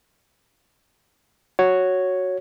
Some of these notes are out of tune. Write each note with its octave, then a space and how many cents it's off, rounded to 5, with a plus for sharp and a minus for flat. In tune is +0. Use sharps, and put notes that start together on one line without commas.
F#4 +0 C#5 +0